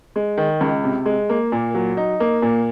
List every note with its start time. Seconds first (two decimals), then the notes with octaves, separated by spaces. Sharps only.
0.16 G#3
0.37 D#3
0.61 C#2
0.84 C3
1.06 G#3
1.29 A#3
1.52 A#2
1.74 F#3
1.97 D#4
2.20 A#3
2.42 A#2